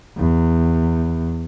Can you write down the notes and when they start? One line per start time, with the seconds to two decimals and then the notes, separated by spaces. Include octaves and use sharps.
0.18 E2